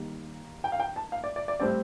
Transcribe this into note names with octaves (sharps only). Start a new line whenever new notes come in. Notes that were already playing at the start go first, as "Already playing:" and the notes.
Already playing: D#3 G3 A#3
G5
F5
G5
A5
F5
D5
D5
D5
A2 G3 C4 D5